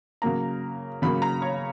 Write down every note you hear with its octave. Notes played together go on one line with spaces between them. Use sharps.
C#3 F#3 A#3 A#5
C#3 F#3 A#3 B5
A#5
C#5